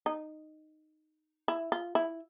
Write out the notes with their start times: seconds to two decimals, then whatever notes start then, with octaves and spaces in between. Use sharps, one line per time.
0.06 D#4
1.48 E4
1.72 F4
1.95 E4